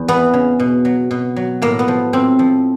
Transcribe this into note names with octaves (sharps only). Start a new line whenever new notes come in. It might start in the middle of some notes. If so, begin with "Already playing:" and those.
Already playing: E2
E3 B3
C#3
B2
F#3
B2
F#3
A2 A#3
B3
F3
A2 C4
F3